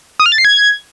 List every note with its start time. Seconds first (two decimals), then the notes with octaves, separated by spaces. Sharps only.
0.20 D#6
0.26 F6
0.32 A6
0.38 C7
0.45 G#6